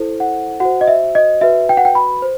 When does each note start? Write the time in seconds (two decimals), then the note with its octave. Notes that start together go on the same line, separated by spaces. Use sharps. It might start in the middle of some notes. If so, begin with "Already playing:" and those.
Already playing: E4 A4 C5
0.20 F#5
0.60 F#4 C5 F#5
0.81 D#5
0.87 E5
1.15 D#5
1.41 F#4 B4 E5
1.69 G5
1.77 F#5
1.85 G5
1.95 B5
2.22 C5